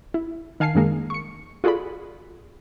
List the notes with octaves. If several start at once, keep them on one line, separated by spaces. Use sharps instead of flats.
E4
D#3 F5 G#5 A5 C7
F#2 D#3 G#3 A#3
C#6 C#7
F4 F#4 G#4 A4 D5 B5